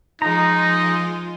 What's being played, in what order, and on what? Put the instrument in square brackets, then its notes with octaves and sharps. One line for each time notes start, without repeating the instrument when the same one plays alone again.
[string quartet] F3 G#3 F4 [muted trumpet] D#4 [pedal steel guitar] A#5